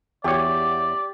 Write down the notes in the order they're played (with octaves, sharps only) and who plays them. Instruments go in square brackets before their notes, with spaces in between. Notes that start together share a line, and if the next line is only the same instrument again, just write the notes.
[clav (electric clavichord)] E2 C#5 [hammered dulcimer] G4 [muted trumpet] D5